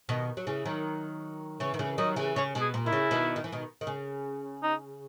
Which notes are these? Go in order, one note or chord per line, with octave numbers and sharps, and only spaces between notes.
B2 D#3
F#3
C#3 E3
D#3 F#3
C#3 E3 C#5
D#3
C#3 E3
D#3 F#3 D#5
C#3 E3
C#3 C#5
B2
G#4
A#2
D#3 E4
C#3
B2 D#3
D#3
E3
B2 D#3
D#3
C#3
D#4